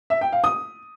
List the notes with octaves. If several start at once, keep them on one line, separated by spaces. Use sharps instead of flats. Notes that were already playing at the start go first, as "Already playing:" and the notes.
E5
G5
F5
D#6